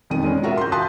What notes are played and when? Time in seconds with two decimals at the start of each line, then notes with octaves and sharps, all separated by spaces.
0.10 E1 F2 D#3 D#7
0.24 G#3 C#4
0.43 F4 F#4 A#4 E5
0.57 C6 G6
0.72 F5 A5 C6 D#6 F#6 B6